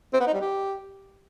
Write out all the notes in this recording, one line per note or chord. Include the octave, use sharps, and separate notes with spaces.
C4
B3
D#4
G3
G4